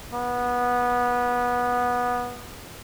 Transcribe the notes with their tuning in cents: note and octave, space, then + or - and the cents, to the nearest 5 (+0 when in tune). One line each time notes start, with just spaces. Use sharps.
B3 -15